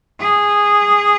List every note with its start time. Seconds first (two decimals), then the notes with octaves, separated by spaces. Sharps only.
0.20 G#4